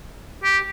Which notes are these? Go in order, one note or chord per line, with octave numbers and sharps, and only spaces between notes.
G4